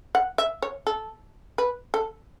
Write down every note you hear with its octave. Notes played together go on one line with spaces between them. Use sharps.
F#5
E5
C#5
A4
B4
A4